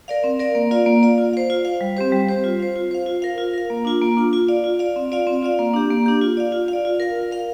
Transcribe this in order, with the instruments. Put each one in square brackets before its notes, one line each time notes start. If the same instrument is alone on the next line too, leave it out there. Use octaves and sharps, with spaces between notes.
[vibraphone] A#4 D5 F5
C4
A#4 D5 F5
A#3
F4 D5 F5
A#3
F4 D5 F5
F4
C5 F5
F4
C5 F5
G3
C4 G4 C5
G3
C4 G4 C5
F4
C5 F5
F4
C5 F5
F4
A#4 F5
F4
A#4 F5
A#3
D4 F4
A#3
D4 F4
F4
D5 F5
F4
D5 F5
C4
F4 D5 F5
C4
F4 D5 F5
A#3
D4 G4
A#3
D4 G4
F4
D5 F5
F4
D5 F5
F4
A#4 F5
F4
A#4 F5